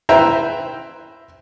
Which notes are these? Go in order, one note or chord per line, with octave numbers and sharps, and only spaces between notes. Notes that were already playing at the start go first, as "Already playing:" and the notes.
E4 B4 C5 E5 G5 A#5